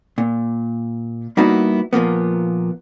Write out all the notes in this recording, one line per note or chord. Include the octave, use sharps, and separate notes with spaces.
A#2
G3 A#3 B3 D#4 E4 F#4
A#2 F3 A#3 B3